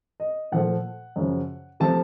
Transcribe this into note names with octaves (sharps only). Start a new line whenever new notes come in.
D#5
A#2 F3 A3 F#5
F#2 C#3 F3
C3 F3 A3 A5